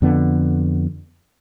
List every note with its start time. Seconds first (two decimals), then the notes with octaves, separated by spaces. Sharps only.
0.02 F2 D3 B3